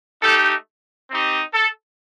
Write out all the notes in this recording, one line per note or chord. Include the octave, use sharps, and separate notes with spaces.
A3 D#4 G4 A4
C4 D#4 G4
A4